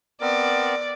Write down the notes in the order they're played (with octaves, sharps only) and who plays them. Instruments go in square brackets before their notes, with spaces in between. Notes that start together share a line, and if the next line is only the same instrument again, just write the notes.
[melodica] B3 C4 A#4 [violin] D5